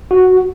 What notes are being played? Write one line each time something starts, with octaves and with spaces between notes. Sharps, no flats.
F#4